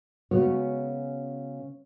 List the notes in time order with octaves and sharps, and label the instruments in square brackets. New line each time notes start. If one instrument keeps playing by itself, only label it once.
[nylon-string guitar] C#3 G#3 B3 C#4 F#4 C#5